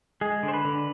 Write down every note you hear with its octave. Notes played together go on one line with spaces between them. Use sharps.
G#3 G#4
D3
C5
B4
D3